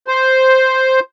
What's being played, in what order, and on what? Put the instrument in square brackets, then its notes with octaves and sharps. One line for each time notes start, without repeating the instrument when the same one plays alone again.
[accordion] C5